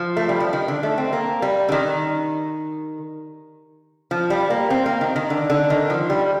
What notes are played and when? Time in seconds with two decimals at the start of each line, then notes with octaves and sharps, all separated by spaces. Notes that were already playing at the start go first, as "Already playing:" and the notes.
Already playing: F3
0.17 A3
0.29 G3
0.40 F3
0.53 D#3
0.68 D3
0.83 A3
0.98 C4
1.13 A#3
1.42 G3
1.69 D3
1.72 D#3
4.11 F3
4.30 G3
4.50 A#3
4.70 C4
4.86 A#3
5.01 D#3
5.16 D#3
5.30 D3
5.50 D3
5.70 D#3
5.90 F3
6.10 G3